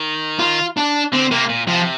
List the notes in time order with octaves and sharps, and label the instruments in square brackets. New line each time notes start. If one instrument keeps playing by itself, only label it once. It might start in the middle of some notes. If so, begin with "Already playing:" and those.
Already playing: [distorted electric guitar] D#3
[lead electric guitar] F4
D4
[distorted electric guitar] D3 [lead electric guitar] C4
[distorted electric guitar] C3 [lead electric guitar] A#3
[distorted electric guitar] A#2
[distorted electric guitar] C3 [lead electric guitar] F3